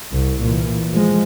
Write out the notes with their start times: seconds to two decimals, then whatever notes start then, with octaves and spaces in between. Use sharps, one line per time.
0.12 C2
0.42 A#2 E3
0.92 F3 G#3